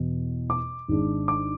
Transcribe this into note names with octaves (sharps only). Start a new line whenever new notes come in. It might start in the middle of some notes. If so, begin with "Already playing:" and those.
Already playing: E2 B2
D6
G#1 G#2 G#3 D4
D6